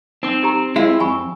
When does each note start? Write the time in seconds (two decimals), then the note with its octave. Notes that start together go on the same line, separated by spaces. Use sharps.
0.23 C4 D#4 D6
0.42 D#4 G4 A#5
0.76 G#3 E4 F4
1.00 F2 G#5 B5 C#6